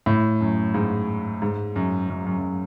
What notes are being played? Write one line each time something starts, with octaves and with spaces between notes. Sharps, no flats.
A2
F#2
G#2
G#2
F#2
F#2
F#2
F#2